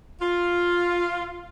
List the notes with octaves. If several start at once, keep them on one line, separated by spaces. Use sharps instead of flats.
F4